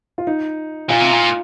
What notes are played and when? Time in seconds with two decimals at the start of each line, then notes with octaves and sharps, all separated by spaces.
0.18 F4
0.27 D#4
0.89 A#2 F4
1.00 C3
1.11 A#2